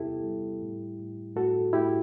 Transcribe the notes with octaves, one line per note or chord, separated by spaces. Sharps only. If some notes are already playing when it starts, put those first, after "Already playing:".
Already playing: E2 C3 G3 B3 E4 G4 A4
G3
A2
A2
A2 F#4 A4
A2 E4 G4